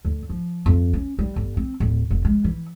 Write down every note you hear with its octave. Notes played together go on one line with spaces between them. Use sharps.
D2
F3
F2
C#4
G3
G1
C4
D1
F1
G#3
E3